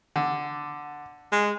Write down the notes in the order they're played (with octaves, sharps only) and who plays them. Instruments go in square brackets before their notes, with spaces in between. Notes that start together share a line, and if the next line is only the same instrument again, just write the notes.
[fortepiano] D3
[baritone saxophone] G#3